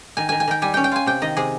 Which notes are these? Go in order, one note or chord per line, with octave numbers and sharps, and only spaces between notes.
D#3 G#5
D#3 G#5
G#5
D#3 G5
G3 G#5
C#4 G5
G5
F4 G#5
C3 G5
D#3 D#5
C3 G#4